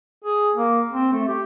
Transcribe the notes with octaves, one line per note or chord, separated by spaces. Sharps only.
G#4
A#3
C4
A3
G4